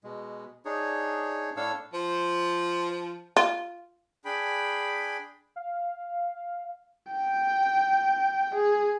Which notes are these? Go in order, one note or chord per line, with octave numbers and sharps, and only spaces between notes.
B2 G#3
D4 D#4 G#4 C#5
A2 D4 A4 C#5 F5 E6
F3 C5
F4
D4 G#4 G5 B5
F5
G5
G#4